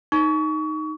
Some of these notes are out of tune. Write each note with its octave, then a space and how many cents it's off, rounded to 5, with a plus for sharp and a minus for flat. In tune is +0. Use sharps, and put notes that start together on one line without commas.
D#4 +0 C#6 +30